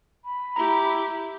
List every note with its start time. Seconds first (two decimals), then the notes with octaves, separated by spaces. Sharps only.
0.24 B5
0.56 E4 G4 A#5